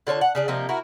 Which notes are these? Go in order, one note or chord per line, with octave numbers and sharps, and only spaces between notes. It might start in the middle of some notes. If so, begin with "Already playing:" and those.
D3 F4 C#5 A5
F#5
C#3 D4 G#4
C3 F3 A#3 D#4
E4 F#4 A#4